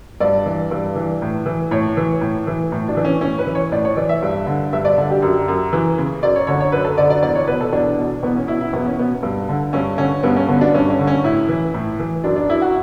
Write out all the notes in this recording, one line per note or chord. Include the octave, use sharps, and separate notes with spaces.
G2 D5
E3
G2
E3
A2
E3
A2 C#5
E3
A2
E3
A2
D4
E3
C#4
A2 C#4
B4
E3
C#5
A2 D5
C#5
E3 D5
E5
G2
D3
G2 E5
D5
D3
G4
F#2
F#2
E3
C#3
F#2 D5
C#5
D3 C#5
C#5
F#2 B4
A4
D3 D5
D5
E2 D5
C#5
B2 B4
A4
E2 D4
B2
E2 B3
C#4
B2 E4
E4
E2 B3
C#4
B2 B3
G2
D3
G2 C#4
D3 C#4
G2 B3
C#4
D3 B3
D4
G2 C#4
C#4
D3
C#4
A2 E4
E3
A2
E3
F#2 D4
D4
F#2 E4
F#4